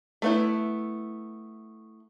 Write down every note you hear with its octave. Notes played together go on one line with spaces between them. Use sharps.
A3 B3 E4